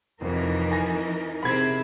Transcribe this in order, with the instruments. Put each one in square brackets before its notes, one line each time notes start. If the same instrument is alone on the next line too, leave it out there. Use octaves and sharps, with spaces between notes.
[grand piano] F1 [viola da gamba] F2 [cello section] E3 D#4 A#4 [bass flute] F3
[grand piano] G#5 A#6
[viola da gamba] C3 C4 [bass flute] G#4 [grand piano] B5 G#6